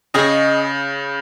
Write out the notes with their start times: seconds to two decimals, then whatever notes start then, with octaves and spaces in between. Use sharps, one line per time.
0.14 C#3 G#4 D#5 G#5 C#6